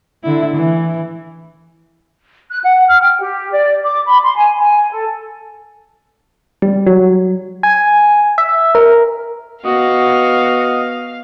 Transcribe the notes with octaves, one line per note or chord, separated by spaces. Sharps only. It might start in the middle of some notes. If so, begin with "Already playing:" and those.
D3 E4
E3
F#6
F#5
F6
G5
G4
D5
D6
B5
C6
G#5
G#5
A4
G3
F#3
G#5
E5
A#4
B3 F#4 D#5 F5